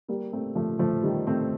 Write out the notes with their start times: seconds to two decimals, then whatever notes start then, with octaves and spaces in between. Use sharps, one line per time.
0.08 G3 A#3
0.32 A3 C4
0.55 F3 A3
0.79 F3 A3
1.03 D#3 G3
1.27 A3 C4